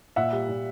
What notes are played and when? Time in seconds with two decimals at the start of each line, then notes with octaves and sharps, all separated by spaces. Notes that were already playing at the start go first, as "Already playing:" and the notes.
0.16 A#2 E5 F#5
0.32 G3
0.49 A#2